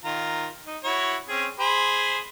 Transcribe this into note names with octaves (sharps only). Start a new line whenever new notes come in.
D#3 F4 A#5
D#4
E4 F#4 C#5
C4 C#4 G#4
G#4 C5 B5